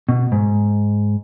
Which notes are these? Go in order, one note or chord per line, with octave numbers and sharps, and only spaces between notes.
B2
G#2